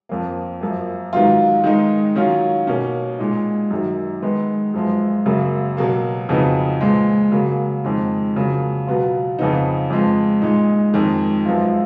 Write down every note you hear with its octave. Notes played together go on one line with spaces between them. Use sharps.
F2 F3 A#3
F#2 F3 A#3
G#2 D#3 F#3 B3 F4
D#3 G#3 D#4
D#3 F#3 C#4 F4
B2 A#3 C#4
A#2 G#3 D#4
F#2 D#3 F#3
D#3 G#3 B3 D#4
F#2 F3 G#3
F#2 C#3 F#3 A#3
B2 F#3 A#3
F2 C#3 F#3 B3 D#4
A#2 F3 G#3
C#3 F#3 A#3
F2 D#3 G#3
F2 C#3 F#3 A#3
B2 F#3 B3 F4
F2 C#3 F3 B3 D#4
F2 F3 G#3
A#2 G#3 D#4
F2 D#3 G#3
F#2 F3 G#3 B3 F4